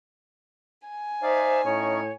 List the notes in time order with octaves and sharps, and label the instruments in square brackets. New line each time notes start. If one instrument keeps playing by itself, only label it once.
[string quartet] G#5
[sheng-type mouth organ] D#4 D5 F5 [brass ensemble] C5 [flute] E5
[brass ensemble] A2 [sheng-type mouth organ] C#4 D#4 [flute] C#5